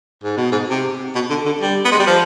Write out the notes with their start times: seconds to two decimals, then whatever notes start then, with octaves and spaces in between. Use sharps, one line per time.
0.24 G#2
0.37 B2
0.52 G#2
0.70 C3
1.15 B2
1.30 D3
1.46 D3
1.61 G3
1.85 B3
1.92 G#3
1.99 G3
2.07 F3